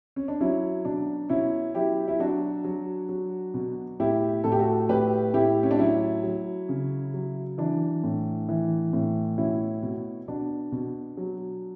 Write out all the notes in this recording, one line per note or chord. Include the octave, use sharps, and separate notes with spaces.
C#4
D4
F#3 C#4 E4
B2 D4
B2 C#4 E4
F#3 E4 G4
E4
F#3 D4 F#4
F#3
F#3
B2
A2 E4 G4
A2 A4
G4
F#4 A4
A2 G4 B4
A2 E4 G4
C#4
D4
F#3 C#4 E4
F#3
C#3
F#3
E3 D4
A2
E3
A2
B2 C#4 E4
B2
B2 D4
B2
F#3